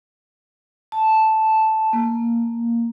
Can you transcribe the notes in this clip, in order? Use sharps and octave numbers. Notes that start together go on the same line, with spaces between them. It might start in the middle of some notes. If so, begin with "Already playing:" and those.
A5
A#3